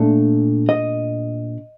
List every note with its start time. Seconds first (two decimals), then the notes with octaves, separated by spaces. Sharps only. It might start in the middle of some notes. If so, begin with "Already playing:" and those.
Already playing: A#2 A3 D4
0.69 D#5